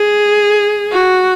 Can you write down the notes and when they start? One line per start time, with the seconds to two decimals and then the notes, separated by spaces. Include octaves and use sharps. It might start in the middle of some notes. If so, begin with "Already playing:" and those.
Already playing: G#4
0.92 F#4